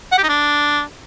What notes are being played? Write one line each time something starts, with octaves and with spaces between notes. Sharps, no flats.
F#5
G4
D#4
D4